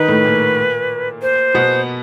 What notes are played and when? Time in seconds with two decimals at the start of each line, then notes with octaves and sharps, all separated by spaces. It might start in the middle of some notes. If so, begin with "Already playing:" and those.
Already playing: D#3 D#4 B4
0.08 A2 A3
0.25 A#2 A#3
1.22 C5
1.54 B2 B3